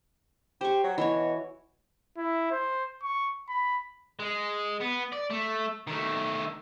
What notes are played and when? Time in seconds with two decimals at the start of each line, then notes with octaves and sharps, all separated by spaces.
0.61 G4 C5 C#6
0.84 F#3
0.98 B2 E3 F#4 C#5
2.17 E4
2.51 C5
3.03 C#6
3.49 B5
4.20 G#3
4.81 B3
5.13 D5
5.31 A3
5.87 D#3 A3